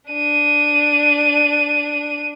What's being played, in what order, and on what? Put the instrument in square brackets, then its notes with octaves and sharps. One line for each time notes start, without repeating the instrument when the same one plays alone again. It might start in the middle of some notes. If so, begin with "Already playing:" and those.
[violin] D4 D#7